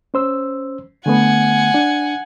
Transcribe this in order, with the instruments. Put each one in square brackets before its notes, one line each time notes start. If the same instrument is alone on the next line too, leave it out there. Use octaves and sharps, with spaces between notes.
[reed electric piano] C#4 C5 E6
[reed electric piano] D3 A3 B3 [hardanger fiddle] F#5 G#5
[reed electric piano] D4